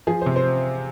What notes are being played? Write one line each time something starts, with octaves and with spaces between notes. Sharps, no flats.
F3 G#4
C3 C5
C5